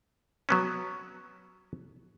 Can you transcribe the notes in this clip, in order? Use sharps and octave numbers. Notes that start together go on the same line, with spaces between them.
F#3 B3 C#4